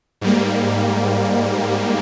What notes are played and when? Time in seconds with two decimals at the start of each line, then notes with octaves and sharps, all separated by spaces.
0.21 G#2 G3 A#3